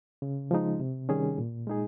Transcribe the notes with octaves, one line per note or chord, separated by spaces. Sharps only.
C#3
F3 G#3 D#4
C3
D#3 G3 C#4 G#4
A#2
G#3 D#4 G#4